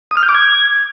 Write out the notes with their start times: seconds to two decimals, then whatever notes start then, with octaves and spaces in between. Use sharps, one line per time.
0.11 D#6
0.17 F6
0.23 G6
0.29 D6
0.35 G#6